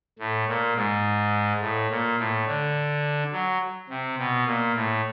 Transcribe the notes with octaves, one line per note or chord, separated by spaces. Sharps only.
A2
A#2
G#2
A2
A#2
A2
D3
F#3
C3
B2
A#2
A2